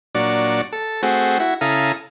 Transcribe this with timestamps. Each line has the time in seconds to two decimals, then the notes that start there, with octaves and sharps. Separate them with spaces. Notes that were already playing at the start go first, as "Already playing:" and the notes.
0.15 A#2 F#3 D4 D5 C#6
0.73 A4
1.03 A3 C4 F#4 G#4
1.40 E4 F#4
1.61 C#3 E4 A4 F5 A#5 D#6